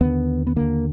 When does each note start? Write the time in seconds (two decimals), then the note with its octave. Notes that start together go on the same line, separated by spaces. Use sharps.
0.01 D#2 D3 B3
0.47 B3
0.56 D#2 D3 A#3